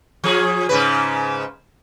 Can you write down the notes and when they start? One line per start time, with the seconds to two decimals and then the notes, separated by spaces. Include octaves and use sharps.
0.24 F3 G#4
0.69 G#2 C#3 B4